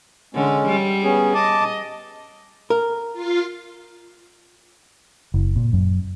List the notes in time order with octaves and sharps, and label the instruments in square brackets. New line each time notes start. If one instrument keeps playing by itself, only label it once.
[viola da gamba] D3 [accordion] G#3 C#4
[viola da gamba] G3
[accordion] B3 C#4 G#4
[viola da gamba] D#5 [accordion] A5 D6
[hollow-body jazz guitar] A#4
[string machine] F4 F5
[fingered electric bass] F#1
A#2
F#2